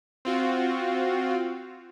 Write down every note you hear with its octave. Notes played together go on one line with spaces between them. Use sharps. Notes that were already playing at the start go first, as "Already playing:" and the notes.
C4 F4 F#4